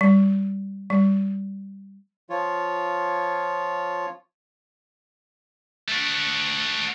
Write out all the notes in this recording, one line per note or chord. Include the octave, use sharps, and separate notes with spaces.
G3
G3
F3 F4 C#5
A3 F#4